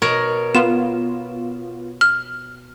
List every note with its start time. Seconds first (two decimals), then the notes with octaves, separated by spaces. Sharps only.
0.02 B2 A#4 C#5
0.55 B3 F4 E7
2.01 F6